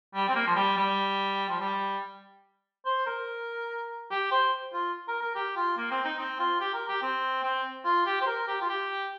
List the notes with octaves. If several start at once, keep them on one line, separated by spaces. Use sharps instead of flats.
G3
C4
A#3
F3
G3
G3
F3
G3
C5
A#4
G4
C5
F4
A#4
A#4
G4
F4
A#3
C4
D#4
C4
F4
G4
A#4
G4
C4
C4
F4
G4
C5
A#4
G4
F4
G4